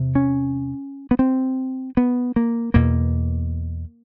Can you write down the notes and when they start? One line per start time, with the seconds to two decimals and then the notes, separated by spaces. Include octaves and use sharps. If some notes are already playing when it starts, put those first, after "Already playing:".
Already playing: E2 C3
0.15 C#4
1.11 B3
1.19 C4
1.97 B3
2.36 A#3
2.74 E2 B2 A#3